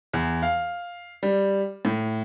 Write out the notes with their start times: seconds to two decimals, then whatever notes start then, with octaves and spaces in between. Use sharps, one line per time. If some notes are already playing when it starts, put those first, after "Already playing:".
0.14 E2
0.43 F5
1.23 G3
1.85 A2